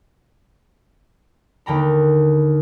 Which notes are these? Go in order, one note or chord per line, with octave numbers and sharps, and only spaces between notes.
D#2 D3 G5 A#5 B5